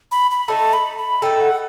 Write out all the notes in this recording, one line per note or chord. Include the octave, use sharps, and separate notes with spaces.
B5
B5
A3 D#4 A4 A5
B5
B5
A3 D#4 A4 G5
F#5